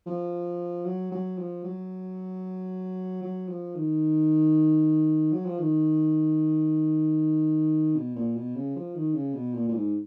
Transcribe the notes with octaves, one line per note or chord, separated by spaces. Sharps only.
F3
F#3
F#3
F3
F#3
F#3
F3
D#3
F#3
F3
D#3
B2
A#2
B2
C#3
F3
D#3
C#3
B2
A#2
A#2
G#2